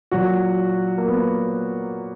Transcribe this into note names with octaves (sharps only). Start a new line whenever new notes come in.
A#2 F#3 F#4
A#3
B3